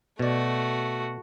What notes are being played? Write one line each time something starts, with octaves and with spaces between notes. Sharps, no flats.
B2 A3 F#4 D5